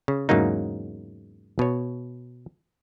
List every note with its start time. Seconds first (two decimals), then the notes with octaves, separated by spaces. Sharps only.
0.08 C#3
0.29 E2 G#2 C#3 F#3 A#3 D#4
1.59 B2 C#5